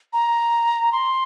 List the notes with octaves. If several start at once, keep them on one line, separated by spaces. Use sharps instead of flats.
A#5
C6